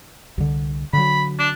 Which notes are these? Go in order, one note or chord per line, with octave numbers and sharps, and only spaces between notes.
C2 D3
D3 F#3 B5
D4